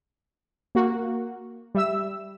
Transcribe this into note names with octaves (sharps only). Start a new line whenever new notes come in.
A#3 F#4
G3 E5 E6